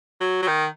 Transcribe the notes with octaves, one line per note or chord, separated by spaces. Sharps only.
F#3
F#3
D#3